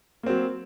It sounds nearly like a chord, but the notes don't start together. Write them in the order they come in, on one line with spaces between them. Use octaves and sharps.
A#3 C4 F#3